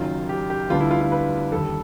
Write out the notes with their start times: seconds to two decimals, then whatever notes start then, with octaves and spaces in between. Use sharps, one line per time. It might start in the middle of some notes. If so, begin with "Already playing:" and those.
Already playing: F#1 F#2 D#3 F#3 F4
0.29 G4
0.50 G4
0.70 D2 D3 G3 B3 D4 F4
0.80 E4
0.91 F4
1.01 F4
1.12 B4
1.52 D#2 D3 G3 A4